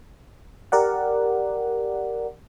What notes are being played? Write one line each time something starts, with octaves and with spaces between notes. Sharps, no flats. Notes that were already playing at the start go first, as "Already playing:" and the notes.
G4 A#4 D5 F#5